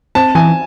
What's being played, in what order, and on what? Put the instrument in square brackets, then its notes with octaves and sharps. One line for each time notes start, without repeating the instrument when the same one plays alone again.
[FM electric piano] C4 [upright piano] A5
[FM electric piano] E3 [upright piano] G#5